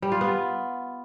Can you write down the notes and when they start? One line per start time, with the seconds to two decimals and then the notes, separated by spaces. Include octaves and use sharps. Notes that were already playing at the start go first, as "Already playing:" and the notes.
0.02 G3
0.12 F4
0.21 B3